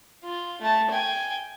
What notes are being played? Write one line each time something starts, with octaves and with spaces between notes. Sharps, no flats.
F4
A3 A5
G5 G#5